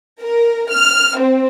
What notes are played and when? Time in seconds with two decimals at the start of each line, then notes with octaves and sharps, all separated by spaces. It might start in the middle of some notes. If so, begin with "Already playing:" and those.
0.21 A#4
0.71 F6
1.18 C4